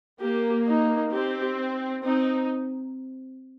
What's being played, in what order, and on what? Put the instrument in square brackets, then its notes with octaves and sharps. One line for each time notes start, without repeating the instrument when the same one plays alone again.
[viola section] A#3 [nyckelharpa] G4
[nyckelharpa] D#4
[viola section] C4 [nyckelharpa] G4
[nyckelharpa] C4 [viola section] D#4